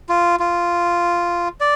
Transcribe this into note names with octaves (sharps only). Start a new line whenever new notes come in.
F4
F4
D5